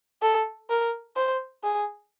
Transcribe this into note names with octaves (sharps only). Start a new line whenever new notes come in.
A4
A#4
C5
G#4